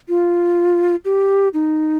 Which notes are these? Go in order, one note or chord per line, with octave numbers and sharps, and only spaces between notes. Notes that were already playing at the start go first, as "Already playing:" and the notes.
F4
G4
D#4